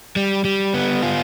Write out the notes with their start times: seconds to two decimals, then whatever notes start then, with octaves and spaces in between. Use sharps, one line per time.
0.16 G3
0.45 G3
0.74 B3
1.03 F4